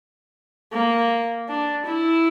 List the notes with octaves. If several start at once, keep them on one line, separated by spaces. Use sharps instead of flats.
A#3
D4
E4